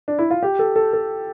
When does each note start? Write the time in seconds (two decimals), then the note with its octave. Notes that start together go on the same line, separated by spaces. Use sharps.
0.08 D4
0.19 E4
0.30 F4
0.43 G4
0.59 A4
0.76 A4
0.93 A4